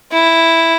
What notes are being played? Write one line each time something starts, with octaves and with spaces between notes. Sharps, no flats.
E4